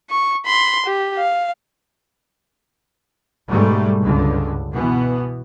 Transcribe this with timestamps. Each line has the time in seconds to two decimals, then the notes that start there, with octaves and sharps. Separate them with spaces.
0.10 C#6
0.46 B5 C6
0.86 G4
1.17 F5
3.50 G#2 B2 G3 A3
4.02 C#2 G2 D3
4.71 B2 E3 B3